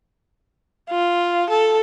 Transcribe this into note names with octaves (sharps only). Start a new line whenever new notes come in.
F4
A4